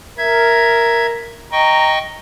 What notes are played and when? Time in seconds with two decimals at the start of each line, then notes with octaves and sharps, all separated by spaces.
0.18 A#4 E5 G#6
1.52 D#5 G5 A#5 C#6